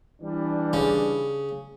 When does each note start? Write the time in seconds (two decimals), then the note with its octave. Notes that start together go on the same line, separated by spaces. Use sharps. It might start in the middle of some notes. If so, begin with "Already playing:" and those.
0.21 E3 G3 D4
0.73 C#3